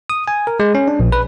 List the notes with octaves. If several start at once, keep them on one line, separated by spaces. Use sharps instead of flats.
D#6
G#5
A#4
G#3
C#4
D4
A#1
B4